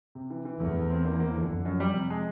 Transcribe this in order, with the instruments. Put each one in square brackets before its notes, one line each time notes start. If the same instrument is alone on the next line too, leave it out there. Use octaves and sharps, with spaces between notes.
[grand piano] C3
E3
E3
[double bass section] E2 [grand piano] A3
[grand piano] A3
C4
A#3
A#3
D3
[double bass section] F2 [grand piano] D3
[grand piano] F#2
G3
C3
G#3